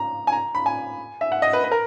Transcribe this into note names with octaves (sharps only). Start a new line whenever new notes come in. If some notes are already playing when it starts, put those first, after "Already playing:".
Already playing: A#5
G#5
A#5
B5
G#5
E5
F#5
D#5
B4
B4
A#4